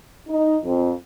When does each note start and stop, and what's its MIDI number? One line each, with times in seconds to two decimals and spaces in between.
0.29 0.58 63
0.64 0.92 41